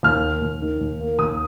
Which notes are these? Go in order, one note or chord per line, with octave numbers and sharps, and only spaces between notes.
D#2 F6
A#3
D#2
D#3
D#2
A#3
D#2 D#6